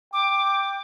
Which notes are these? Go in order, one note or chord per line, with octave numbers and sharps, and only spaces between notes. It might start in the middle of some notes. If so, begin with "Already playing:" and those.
G5 D6